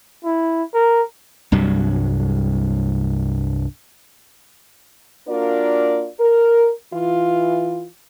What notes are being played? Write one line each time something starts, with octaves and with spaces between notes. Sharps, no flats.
E4
A#4
C2 G2 F#3
A#3 D4 F4 F#4 A#4 D5
A#4
E3 F4